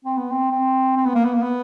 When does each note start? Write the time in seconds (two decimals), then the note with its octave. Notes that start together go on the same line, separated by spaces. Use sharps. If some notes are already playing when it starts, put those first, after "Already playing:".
0.05 C4
0.17 B3
0.31 C4
0.51 C4
0.97 C4
1.06 B3
1.15 A#3
1.25 B3
1.34 A#3
1.42 B3